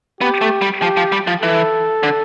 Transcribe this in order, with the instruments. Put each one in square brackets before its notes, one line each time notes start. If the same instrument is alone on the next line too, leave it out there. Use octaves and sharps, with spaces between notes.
[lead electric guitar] B3 [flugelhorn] G4
[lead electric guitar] A3
G3
[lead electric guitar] F3 [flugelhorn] G4
[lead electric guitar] F3
G3
F3
[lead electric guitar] E3 [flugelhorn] A4
[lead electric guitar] D3